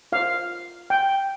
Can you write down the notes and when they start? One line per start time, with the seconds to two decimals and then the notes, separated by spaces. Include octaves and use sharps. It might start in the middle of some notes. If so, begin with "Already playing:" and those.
0.12 F4 C5 F5
0.90 G5